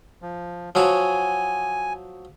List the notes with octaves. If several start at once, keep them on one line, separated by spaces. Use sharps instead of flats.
F3
F3 F#3 F#4 G#5